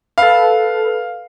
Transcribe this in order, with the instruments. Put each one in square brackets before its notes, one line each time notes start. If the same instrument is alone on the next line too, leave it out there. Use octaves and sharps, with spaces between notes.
[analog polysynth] A4 B4 [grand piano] F5